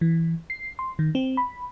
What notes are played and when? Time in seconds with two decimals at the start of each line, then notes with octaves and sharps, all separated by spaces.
0.01 E3
0.50 C7
0.79 C6
0.99 D#3
1.15 C4
1.37 B5